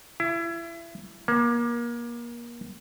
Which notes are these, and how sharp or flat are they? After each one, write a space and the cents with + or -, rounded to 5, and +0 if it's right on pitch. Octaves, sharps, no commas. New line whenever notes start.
E4 +30
A#3 +30